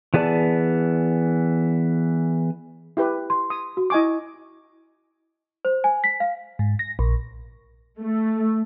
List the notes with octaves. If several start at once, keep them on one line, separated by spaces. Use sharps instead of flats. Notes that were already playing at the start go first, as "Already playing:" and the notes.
E3 B3 G#4 D5 A5
E4 G4 B4
C6
D#6
F#4
E4 D#5 G#5 C#6 D6
C5
G#5
B6
F5
G#2
A#6
A#1
A3